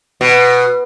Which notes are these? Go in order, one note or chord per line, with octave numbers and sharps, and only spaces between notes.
B2